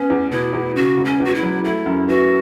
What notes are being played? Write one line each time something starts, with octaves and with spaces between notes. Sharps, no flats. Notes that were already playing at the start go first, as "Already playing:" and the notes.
Already playing: B3 C#4
E2
B2 E4
E2
C#3 F#4
E1
C#4
E2 F#4
E4
F#3
A3 E4
F#2
E3 F#4